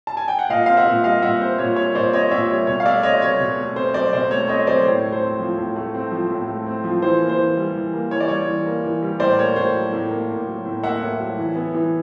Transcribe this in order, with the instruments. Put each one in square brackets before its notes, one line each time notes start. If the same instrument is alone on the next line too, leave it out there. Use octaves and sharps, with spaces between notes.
[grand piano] A5
G#5
G5
F#5
A#2 D#5 F5
C4 F5
E5 F#5
A#2
G3 D#5 F5
A#2 E5 F#5
C4 C5
A#2 C#5
G3 C#5
A#2 C5 D5
C4 C#5 D#5
A#2 D5 E5
G3 C#5
B2 C#5
F5
A3 D5 E5
C4 C#5 D#5
F#3 C#5
B2
A3
C4 C5
F#3 C5 D5
B2 C5 D5
A3 C#5
C4 C#5 D#5
F#3 C5 D5
C5
A2 C#5
A3
C5
C4
F3
A2
A3
C4
F3
A2
A3
C4
F3
E3 C5
A#3
C5
E3
G3
E3
A#3
E3 C#5
D5
G3 C#5
E3
A#3
E3
G3
A2 C5 D5
A#3 C#5
A2 C5
F#3
A2
A#3
A2
F#3
A2
A#3 E5 F#5
A2
F#3
E3
B3
E3